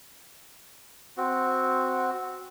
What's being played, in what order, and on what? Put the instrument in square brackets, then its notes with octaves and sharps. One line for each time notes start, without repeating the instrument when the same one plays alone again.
[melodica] C4 F#4